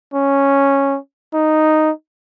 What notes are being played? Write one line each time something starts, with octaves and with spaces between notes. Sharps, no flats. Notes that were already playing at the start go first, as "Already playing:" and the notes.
C#4
D#4